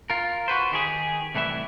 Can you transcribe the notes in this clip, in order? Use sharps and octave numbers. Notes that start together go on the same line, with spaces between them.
F4 A#4
F#4 B4 C5
D#3 G4 G#4
C2 A2 E3 E4 E5